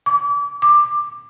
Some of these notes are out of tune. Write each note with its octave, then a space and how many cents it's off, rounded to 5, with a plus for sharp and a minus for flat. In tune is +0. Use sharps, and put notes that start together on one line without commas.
D6 -35
D6 +15